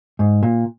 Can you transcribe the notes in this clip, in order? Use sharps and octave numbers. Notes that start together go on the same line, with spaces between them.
G#2
A#2